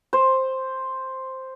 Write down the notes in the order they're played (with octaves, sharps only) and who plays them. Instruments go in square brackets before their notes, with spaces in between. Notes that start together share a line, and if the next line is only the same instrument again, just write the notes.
[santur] C5